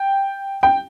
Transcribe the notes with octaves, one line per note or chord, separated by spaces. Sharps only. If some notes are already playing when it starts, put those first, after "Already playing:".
Already playing: G5
G5